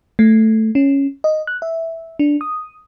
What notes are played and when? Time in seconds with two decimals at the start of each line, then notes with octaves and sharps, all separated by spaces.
0.19 A3
0.75 C#4
1.24 D#5
1.47 F#6
1.62 E5
2.19 D4
2.41 D#6